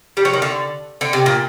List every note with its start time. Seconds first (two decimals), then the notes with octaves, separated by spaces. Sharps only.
0.17 G3
0.25 F#3
0.33 D#3
0.42 D3
1.01 D3
1.13 C3
1.26 A#2